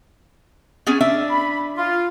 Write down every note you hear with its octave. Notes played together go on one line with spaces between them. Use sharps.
B3 C#4 G#4
D4 E5
B5
F4